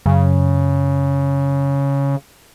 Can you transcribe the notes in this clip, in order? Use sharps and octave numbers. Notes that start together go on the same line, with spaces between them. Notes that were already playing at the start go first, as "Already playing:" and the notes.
F#2 C#3